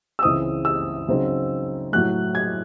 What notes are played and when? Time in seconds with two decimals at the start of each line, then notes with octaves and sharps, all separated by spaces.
0.19 E6
0.23 C#2 C#3 E3 G#3 C4 D#6
0.65 E6
1.08 C#3 F#3 C4 D#4
1.92 A2 F#3 A3 F#6
2.35 G#6